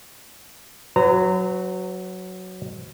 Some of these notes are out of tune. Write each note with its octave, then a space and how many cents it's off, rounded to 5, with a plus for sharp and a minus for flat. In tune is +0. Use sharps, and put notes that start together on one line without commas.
F#3 +0 B4 +40 A#5 -20